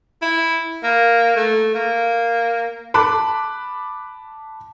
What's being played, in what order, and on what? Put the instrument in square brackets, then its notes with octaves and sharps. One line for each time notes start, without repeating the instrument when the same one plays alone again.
[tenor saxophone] E4
A#3
A3
A#3
[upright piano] A5 B5 D6 F#6